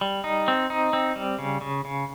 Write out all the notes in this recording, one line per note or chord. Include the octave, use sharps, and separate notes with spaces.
G3
D#4
C4
D#4
C4
G3
C#3
C#3
C#3